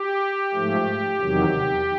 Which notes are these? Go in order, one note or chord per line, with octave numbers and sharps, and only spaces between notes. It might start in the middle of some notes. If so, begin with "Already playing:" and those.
Already playing: G4
G#2 F3 A3
E2 C3 D#3 F#3